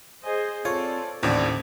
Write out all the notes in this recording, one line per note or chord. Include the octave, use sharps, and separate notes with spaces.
G#4 C5 D#5 G#5
C4 F4 A4 C#5 D5
A1 D#2 A2 D3 C4 D5